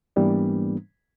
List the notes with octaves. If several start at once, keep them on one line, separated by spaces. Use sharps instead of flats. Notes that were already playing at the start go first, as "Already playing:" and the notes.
G#2 E3 G3 A#3 B3 D4